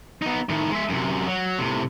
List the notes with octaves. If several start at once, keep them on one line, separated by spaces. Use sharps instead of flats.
B3 D#4
A2 D#3
G#3 E5
F#2 C3
F#3
A2 C3